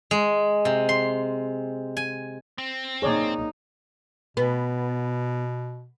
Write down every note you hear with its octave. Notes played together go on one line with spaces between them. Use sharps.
G#3
C3
C6
G#5
C4
A#3 D#4 G#4 C#5 D5
B2 B3